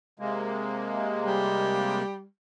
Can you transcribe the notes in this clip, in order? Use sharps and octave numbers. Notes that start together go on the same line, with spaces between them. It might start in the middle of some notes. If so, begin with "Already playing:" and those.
C3 G#3 A#3
G3